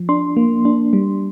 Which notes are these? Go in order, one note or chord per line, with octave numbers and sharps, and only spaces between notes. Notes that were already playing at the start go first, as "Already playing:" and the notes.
Already playing: F3
D4 C6
A#3
D4
G3